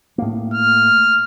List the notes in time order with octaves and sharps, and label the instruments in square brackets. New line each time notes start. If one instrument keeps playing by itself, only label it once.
[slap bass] A2 A#3
[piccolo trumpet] F6